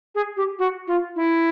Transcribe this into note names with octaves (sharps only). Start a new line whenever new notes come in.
G#4
G4
F#4
F4
E4